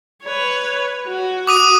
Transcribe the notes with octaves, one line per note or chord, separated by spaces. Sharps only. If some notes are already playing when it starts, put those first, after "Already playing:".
B4 C#5
F#4
D6 D#6 D#7